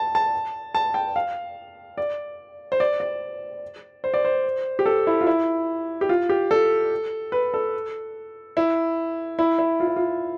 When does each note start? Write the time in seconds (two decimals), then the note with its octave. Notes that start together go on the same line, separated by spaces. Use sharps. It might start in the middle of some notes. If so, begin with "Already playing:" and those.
Already playing: A5
0.15 A5
0.75 A5
0.94 G5
1.16 F5
1.98 D5
2.72 C5
2.80 D5
3.00 D5
4.04 C5
4.14 D5
4.25 C5
4.79 G4
4.86 A4
5.07 E4
5.21 F4
5.27 E4
6.01 G4
6.09 F4
6.29 G4
6.51 A4
7.32 B4
7.54 A4
8.57 E4
9.39 E4
9.59 E4
9.80 F4
9.87 E4
9.96 F4